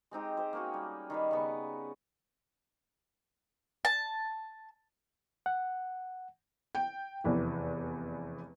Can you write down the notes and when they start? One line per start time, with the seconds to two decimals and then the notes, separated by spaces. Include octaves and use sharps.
0.11 G#3 C4 D#4 G4
0.37 G4 C5
0.53 A#3 C#4 F#4
0.74 G3
1.10 D#3 G3 B4
1.31 C#3 B3 C#6
3.85 A5
5.46 F#5
6.75 G5
7.24 F1 E2 E3